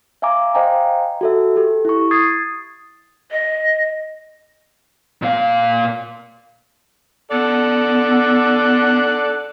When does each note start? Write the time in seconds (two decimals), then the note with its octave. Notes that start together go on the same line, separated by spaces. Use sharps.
0.22 E5 F5 G#5 A#5 D6
0.55 C5 D#5 F5 G5 G#5 A#5
1.21 F#4 A4 E5
1.56 G4 A4
1.85 E4 C#6
2.11 D#6 G#6 A6 C7
3.31 D#5
5.22 A#2 F5
7.31 B3 A4 D5 F#5